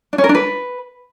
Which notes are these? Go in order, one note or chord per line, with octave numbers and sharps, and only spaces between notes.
D4
C#4
A#4
D4
B4